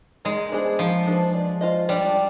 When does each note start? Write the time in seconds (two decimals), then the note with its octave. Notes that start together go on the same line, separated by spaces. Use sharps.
0.25 D#3 G#3
0.52 B3 D4 G#4 C5
0.79 D#3 F3
1.07 B3 D4 G#4 C5
1.34 D4
1.61 F4 C5 D#5
1.89 G3 D4